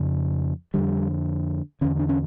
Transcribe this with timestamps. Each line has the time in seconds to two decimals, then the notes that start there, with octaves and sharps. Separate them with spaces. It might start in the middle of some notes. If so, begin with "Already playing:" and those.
Already playing: F2 C#3
0.74 F2 D3 G3
1.81 E2 D3 C#4
1.99 D4
2.09 C#4